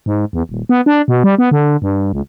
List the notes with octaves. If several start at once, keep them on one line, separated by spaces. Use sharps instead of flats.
G#2
E2
D#1
B3
D4
B2
G3
B3
D3
G2
C#2